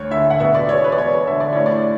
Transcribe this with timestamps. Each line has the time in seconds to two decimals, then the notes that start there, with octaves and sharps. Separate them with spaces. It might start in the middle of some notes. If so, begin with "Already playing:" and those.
Already playing: D2 C#5
0.11 D3 E5
0.30 F#5
0.40 B2 E5
0.55 D5
0.69 E1 C#5
0.84 B4
0.92 D5
0.97 E1 C#5
1.27 D3 E5
1.40 D5
1.53 A2 C#5
1.66 D5